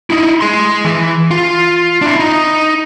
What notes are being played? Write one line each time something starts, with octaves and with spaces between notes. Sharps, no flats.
D#4 E4
G#4 C6
E3
F4
D4 E4
D#4